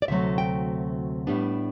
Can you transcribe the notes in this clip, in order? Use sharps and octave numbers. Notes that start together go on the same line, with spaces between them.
D5
D2 C3 F#3 A3 E5
G5
A2 G3 B3 D4